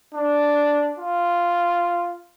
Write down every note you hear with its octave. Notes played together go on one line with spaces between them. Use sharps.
D4
F4